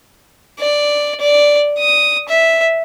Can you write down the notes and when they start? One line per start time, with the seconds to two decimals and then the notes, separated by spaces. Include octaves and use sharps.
0.59 D5
1.21 D5
1.79 D#6
2.29 E5